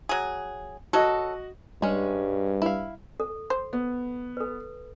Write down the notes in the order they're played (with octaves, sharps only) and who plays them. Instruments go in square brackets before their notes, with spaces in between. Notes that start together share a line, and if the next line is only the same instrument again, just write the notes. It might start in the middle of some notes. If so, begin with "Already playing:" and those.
[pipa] F#3 G#4
[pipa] F#3 A4 [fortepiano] F#4 D#5
[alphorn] G2 [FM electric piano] G3 [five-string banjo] G#3 C#4
[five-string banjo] E4 F5
[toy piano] A4
[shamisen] C5
[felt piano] B3
[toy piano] A4 B4